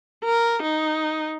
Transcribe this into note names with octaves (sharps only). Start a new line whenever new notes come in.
A#4
D#4